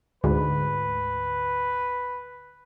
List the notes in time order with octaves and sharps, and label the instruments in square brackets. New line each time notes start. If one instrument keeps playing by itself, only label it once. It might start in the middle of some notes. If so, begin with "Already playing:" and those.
[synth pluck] D2 G#2 [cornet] B4